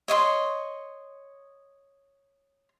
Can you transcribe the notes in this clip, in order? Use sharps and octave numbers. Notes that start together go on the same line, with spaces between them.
C#5 D#5 E5 C6